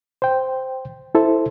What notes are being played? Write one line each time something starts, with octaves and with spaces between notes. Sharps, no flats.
C5 G5
E4 A4 C5